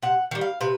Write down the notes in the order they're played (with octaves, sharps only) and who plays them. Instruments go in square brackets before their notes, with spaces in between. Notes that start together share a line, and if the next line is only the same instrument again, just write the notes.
[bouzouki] C3 F#5
D#3 G3
F5
C3 B4